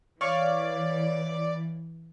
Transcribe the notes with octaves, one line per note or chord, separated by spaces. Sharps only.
E3 C#5 D5 F5 C#6